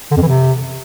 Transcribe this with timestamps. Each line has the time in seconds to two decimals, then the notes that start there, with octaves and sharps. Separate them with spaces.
0.11 D3
0.17 F2
0.22 E3
0.28 C3